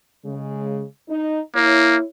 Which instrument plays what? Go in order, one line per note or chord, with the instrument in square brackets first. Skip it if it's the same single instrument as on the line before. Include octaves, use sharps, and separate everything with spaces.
[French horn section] C#3 G#3
D#4
[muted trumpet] A#3 [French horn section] E4 C#5